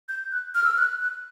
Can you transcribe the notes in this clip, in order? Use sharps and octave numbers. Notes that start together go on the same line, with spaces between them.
G6
F#6
F6
E6
F6
F#6
F#6